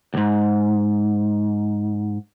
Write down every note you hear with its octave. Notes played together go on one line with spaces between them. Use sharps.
C#2 G#2